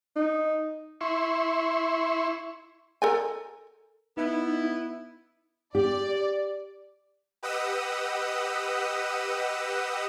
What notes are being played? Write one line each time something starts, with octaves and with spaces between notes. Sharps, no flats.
D#4
E4 C6 C#6
A4 A#4 G#5
B3 D#4 E4
G4 D5
G4 B4 D#5 F#5 D#6 E6